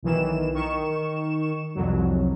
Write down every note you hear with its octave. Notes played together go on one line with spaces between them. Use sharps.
B1 D#3 E3 E7
D#3 C#6 E7
C2 F2 F#3